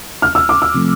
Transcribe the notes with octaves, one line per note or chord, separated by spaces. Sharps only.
F6
E6
D6
E6
C3 F3 A3